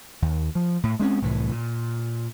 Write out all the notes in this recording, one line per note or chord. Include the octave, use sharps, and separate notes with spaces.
D#2
F3
A2
G#3 C4 C#4
C2 A2 E3
A#2